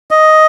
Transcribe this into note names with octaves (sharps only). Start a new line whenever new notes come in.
D#5